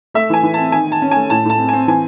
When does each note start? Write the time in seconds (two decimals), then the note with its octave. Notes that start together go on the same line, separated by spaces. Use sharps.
0.14 A3 E5
0.30 E3 G#5
0.43 E3
0.54 C4 A5
0.72 D#3 G#5
0.87 D#3 A5
1.02 C#4
1.11 A3 G#5
1.30 A2 A5
1.45 A2 A5
1.59 C4
1.69 C4 G#5
1.87 E3 G#5